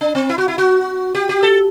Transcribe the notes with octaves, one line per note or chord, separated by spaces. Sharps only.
D4
C4
E4
F#4
E4
F#4
G4
G4
A4